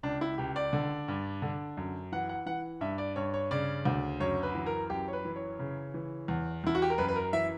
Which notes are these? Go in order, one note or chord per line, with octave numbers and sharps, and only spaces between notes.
C#2 D4
E4
C#2 G4
D5
D3
G2
D3
F#2
E3 F#5
F#5
E3 F#5
G2 E5
D5
G2 C#5
C#5
C#3 D5
D2
F#2 C#5
B4
E3
A#4
F#2 G4
C#5
B4
E3
C#5
C#3
E3
E2
E2 E4
F#4
G4
A#4
F#2 B4
B4
A#4
E3 E5